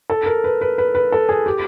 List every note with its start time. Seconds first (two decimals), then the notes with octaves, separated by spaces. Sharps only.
0.10 A4
0.26 A#4
0.44 B4
0.61 B4
0.78 B4
0.95 B4
1.12 A4
1.29 G#4
1.46 G4